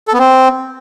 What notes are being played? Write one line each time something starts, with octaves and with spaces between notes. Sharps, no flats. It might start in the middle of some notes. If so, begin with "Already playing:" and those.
A4
B3
C4